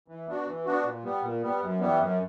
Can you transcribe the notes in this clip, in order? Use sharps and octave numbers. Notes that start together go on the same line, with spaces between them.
E3
B3 D4 F#4
E3
B3 D4 F#4
A#2
G3 B3
A#2
G3 B3
F#2
E3 G3 B3
F#2